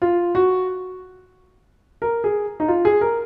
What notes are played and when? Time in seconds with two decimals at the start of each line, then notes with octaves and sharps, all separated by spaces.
0.02 F4
0.35 F#4
2.02 A#4
2.24 G#4
2.60 D#4
2.68 F4
2.85 G#4
3.01 A#4